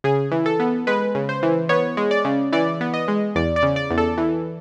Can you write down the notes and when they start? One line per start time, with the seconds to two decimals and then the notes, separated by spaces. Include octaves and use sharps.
0.04 C#3 G#4
0.32 E3
0.46 A4
0.60 B3
0.87 G#3 B4
1.15 C#3
1.29 C5
1.43 E3
1.69 B3 C#5
1.97 G#3
2.11 D5
2.25 C#3
2.52 E3 D5
2.81 B3
2.94 D#5
3.08 G#3
3.35 E2 D5
3.56 D5
3.63 C#3
3.76 D5
3.91 E2
3.98 A4
4.18 E3